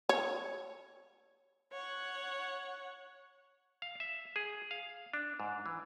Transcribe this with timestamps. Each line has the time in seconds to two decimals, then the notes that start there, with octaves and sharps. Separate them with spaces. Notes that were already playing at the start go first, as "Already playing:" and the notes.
0.09 C#5
1.72 C#5 F#5
3.82 F5
4.00 E5
4.36 G#4
4.71 F5
5.13 D4
5.40 G#2
5.66 E3